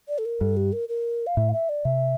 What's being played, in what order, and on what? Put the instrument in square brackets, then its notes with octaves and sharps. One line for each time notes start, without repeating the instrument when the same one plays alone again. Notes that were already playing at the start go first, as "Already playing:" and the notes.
[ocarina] D5
A4
A#4
[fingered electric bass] G2 [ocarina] A4
[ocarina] G4
A#4
A#4
F5
[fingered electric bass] A2 [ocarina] E5
[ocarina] F5
E5
D5
[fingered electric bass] C3 [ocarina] E5